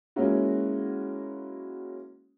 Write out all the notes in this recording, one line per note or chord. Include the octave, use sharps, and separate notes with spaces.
G#3 A#3 C#4 E4 F#4